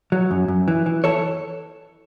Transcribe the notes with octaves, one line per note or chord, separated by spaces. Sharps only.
F#3
F#2
F#2
E3
E3
E3 A4 C#5